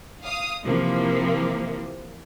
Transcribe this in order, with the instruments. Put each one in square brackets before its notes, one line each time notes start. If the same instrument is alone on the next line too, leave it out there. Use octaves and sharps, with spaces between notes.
[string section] F5 D#6
C3 E3 F3 A#3